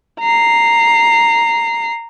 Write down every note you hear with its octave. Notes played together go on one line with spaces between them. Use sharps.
A#5 C7